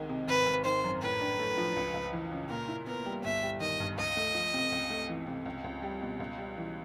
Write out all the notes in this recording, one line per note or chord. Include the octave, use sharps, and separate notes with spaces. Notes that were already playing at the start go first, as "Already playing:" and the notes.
Already playing: C2 D#3 G#3
C3
G#1 B4
G#1
D#3 C5
F#2
A2 B4
D4
A3
F3
C#2
C#2
E3
C#3
A#2 A#4
E4
B3 A#4
G3
G1 E5
G3
D#3 D#5
G2
C#2 D#5
A3
F3
C3
C#2
A3
E3
C3
C#2
C#2
G3
B2
C#2
G3
E3